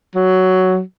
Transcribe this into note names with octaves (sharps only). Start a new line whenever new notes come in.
F#3